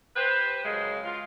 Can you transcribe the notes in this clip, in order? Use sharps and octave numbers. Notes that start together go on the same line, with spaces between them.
G4 B4 C5
F#2 C#3 G#3
F4